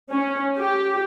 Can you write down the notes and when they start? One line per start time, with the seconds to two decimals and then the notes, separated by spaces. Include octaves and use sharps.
0.10 C#4
0.59 G4